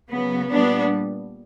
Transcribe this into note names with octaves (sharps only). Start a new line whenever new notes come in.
C#3 F#3 B3
A#2 G3 B3 D4